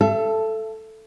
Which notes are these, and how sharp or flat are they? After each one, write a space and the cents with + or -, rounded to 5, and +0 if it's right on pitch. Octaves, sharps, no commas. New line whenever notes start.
A4 +0 E5 +35